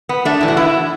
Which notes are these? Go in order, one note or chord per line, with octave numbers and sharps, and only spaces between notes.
B3
A3 D4
A2 E3
F#4
B3 E4